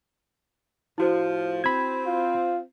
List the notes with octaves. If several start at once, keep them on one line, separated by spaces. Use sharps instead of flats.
A2 F3 E4 F#4 C5
C4 B5 G#6
F4